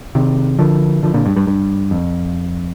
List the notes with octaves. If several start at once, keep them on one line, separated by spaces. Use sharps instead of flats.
C3 D#3
D3 F3
D3 F3
A#2 D3
G2
G2
G2
F2